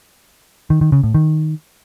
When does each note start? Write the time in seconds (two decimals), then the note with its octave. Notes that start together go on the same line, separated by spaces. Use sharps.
0.70 D#3
0.81 D#3
0.92 C#3
1.03 A2
1.14 D#3